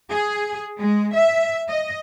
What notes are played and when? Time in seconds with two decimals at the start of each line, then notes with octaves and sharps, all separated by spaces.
0.10 G#4
0.78 G#3
1.13 E5
1.69 D#5